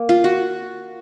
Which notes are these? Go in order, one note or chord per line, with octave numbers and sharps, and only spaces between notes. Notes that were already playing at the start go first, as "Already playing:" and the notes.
Already playing: A#3
F4
F#4